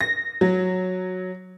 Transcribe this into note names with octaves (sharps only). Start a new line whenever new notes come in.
A#6
F#3